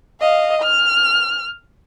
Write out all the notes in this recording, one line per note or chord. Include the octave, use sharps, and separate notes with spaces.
D#5 F5
F6